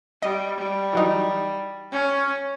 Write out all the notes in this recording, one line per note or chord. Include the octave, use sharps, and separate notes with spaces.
G3 D#5
G3
E3 F#3 D#4
C#4